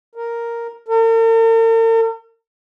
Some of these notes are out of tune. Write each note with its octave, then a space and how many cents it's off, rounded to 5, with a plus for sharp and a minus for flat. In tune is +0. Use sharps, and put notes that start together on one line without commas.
A#4 +0
A#4 -45